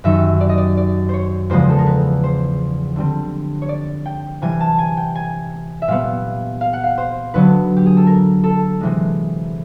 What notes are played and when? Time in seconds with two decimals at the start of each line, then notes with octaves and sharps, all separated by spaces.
0.04 F#2 D#3 G3 E5
0.41 D5
0.49 D#5
0.58 D5
0.77 D5
1.09 C5 C#5
1.50 E2 C#3 F3 G#3 B3 C5
1.69 A4
1.79 A#4
1.86 B4
2.24 C5
2.96 D3 G3 C4
3.62 C#5
3.69 D5
4.06 G5
4.42 C3 E3 G3 G#5
4.60 A5
4.79 G#5
4.97 G5
5.15 G#5
5.82 E5
5.88 A#2 G3 B3 F5
6.61 F5
6.73 F#5
6.84 F5
6.98 C5
7.34 D3 F#3 B3 B4
7.77 G4
7.86 G#4
7.97 A4
8.07 A#4
8.44 A4
8.80 C3 E3 G#3